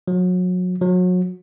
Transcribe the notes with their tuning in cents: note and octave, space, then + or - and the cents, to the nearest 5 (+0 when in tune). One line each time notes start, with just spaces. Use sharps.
F#3 -30
F#3 -30